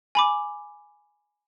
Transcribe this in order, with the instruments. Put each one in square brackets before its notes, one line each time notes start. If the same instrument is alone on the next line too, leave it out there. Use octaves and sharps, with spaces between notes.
[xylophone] G#5 B5 D6